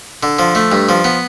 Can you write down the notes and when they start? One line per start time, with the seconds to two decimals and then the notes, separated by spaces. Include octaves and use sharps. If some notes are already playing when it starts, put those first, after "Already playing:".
0.23 D3
0.39 F3
0.55 A3
0.72 G2
0.89 F3
1.04 B3